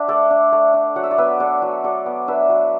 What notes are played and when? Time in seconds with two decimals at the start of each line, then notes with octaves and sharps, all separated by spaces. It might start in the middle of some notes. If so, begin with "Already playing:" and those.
Already playing: D4 E5 F#5
0.08 A3 A4 D5
0.30 D4
0.52 A3
0.74 D4
0.96 F#3 F#5
1.04 E5
1.11 D5
1.18 B3 B4 E5
1.40 D4 A4 D5
1.62 F#3
1.84 F#3 A4 D5
2.06 B3
2.28 D4 B4 E5
2.49 F#3